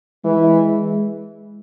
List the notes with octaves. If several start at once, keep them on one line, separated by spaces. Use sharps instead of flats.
E3 G#3